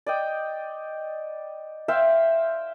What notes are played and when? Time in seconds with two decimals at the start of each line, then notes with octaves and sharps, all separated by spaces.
0.06 D5 D#5 G5
1.88 C5 E5 F5 G5